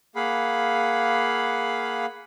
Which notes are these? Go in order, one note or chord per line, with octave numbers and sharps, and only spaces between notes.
A#3 G#4 F5 F#5 B5